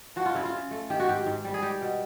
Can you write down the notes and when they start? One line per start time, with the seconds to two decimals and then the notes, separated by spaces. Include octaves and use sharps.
0.16 F3 F#4
0.26 F4
0.35 C#3 E4
0.45 F4
0.53 C#3
0.71 A3
0.90 D#3 G4
1.00 F#4
1.08 G#2 G4
1.26 G#2
1.45 G3
1.54 G#4
1.62 G3 G4
1.81 B2